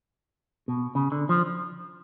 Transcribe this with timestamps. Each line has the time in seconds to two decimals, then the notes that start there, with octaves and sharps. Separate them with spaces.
0.68 B2
0.95 C#3
1.12 D3
1.29 F3